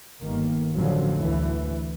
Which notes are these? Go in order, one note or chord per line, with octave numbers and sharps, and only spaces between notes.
G1 D#3 A#3
A1 F2 D3 F3 F#3 C#4
D2 E3